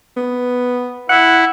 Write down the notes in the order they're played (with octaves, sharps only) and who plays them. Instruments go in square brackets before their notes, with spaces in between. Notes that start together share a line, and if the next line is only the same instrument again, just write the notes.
[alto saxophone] B3
[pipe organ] E4 [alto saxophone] F#5